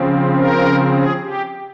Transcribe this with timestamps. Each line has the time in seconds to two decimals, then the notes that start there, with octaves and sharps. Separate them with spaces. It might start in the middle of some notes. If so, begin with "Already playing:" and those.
Already playing: C#3 F3 C4
0.36 A#4
0.93 G#4
1.22 G4